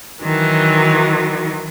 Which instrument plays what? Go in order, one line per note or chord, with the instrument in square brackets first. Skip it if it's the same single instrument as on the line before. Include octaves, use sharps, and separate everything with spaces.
[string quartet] D#3 E3 F#3